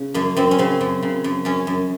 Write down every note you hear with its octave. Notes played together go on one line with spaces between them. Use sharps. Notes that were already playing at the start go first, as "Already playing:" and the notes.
Already playing: C#3
F#2 A#3
F#2 C4
C#4
C#3 C4
F#2
C#3
F#2
F#2 C#4
F#2